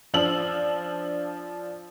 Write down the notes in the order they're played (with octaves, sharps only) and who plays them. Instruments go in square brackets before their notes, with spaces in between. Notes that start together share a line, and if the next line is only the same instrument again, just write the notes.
[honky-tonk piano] F3 D4 E6 F#7